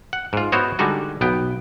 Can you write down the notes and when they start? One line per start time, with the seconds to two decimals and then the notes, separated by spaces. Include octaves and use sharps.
0.13 F#5
0.33 G#2 F4
0.52 B3 E4 F#4 C5 C#5 D#5
0.79 D3 G3 G#3 D#4 F#4
1.21 B1 B3 G5